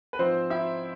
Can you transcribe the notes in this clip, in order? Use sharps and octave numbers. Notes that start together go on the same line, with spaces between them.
B4
G#2 F3 C4 C5
E4 E5